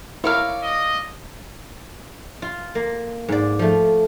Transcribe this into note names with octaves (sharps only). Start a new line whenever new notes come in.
E4 A#4 C#5 D5 F5
D#5
F4
A#3
G#2 D5
F3 A3